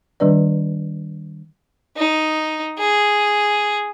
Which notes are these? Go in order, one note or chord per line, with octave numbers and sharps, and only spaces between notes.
D#3 G3 D4 B4 D5
D#4
G#4